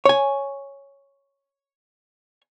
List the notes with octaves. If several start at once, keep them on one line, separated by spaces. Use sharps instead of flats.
C#5 G#5